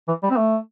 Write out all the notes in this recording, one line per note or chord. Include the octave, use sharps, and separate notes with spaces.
E3
G3
C4
A3